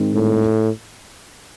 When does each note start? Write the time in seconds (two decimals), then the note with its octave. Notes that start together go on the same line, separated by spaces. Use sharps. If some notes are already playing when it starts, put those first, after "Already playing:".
Already playing: G#2 D#3 G#3 C4 D#4
0.14 A2